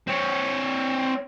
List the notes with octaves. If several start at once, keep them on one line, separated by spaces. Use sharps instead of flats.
C4 C#5